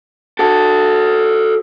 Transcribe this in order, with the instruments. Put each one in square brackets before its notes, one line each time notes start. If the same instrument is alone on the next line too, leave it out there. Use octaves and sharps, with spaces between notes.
[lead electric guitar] F#4 A4